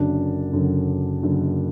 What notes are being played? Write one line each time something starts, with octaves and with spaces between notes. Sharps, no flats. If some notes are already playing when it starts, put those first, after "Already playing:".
Already playing: F#1 F#2 D3 F#3 D4
F#1 F#2 D3 F#3
F#1 F#2 D3 F#3